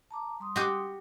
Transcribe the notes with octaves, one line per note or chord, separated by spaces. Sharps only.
A5 A#5 D6
G3 C6 D#6
F#4 G4